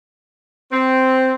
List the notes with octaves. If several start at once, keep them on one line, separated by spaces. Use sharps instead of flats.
C4